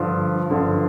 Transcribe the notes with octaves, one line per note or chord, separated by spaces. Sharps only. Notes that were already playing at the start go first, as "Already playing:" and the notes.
Already playing: G2 D3 F3
G1 G2 D3 F3